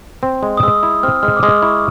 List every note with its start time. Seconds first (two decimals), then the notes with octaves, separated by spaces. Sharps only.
0.23 C4
0.43 G#3
0.57 D#6
0.63 G#3 E6
0.83 E4
1.03 C4 F6
1.23 G#3 F6
1.37 D6
1.43 G#3 D#6
1.62 E4 C#6